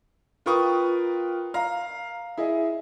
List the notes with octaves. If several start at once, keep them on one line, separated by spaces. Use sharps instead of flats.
F4 A#4 B4 G5 C#6 D#6
F5 A#5
E4 G#4 D#5